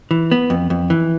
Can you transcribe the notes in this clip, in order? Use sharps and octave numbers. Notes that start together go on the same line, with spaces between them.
E3
B3
F2
F2
E3